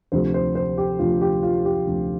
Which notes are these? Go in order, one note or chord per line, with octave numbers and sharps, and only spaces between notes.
D2 C3 F3 C5
C5
C5
G4
D2 C3 F3 F4
G4
F4
G4
D2 C3 F3